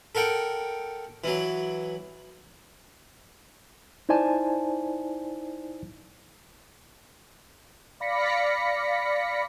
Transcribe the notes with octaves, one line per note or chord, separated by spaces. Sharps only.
A4 A#4 F#5 G5
E3 F#3
D#4 E4 C5 D5 G#5 A5
D5 F5 B5 A#6 B6 C#7